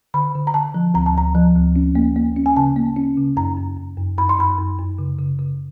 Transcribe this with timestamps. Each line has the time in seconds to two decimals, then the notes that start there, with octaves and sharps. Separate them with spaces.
0.14 D3 B5
0.35 D3
0.47 A#5
0.54 D3 A5
0.74 F3
0.94 D2 A#5
1.06 A5
1.15 D2 A#5
1.35 F3
1.55 D2
1.76 C#4
1.95 A#3
2.16 A#3
2.37 C#4
2.46 G#5
2.56 C#3 A5
2.76 A#3
2.96 C#4
3.17 C#3
3.37 F#2 A#5
3.57 F#2
3.77 F#2
3.97 F#2
4.18 F#2 B5
4.29 C6
4.38 F#2 B5
4.58 F#2
4.79 F#2
4.99 C#3
5.19 C#3
5.39 C#3